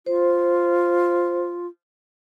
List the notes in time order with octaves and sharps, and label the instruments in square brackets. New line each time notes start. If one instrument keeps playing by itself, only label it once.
[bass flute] F4 [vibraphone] C5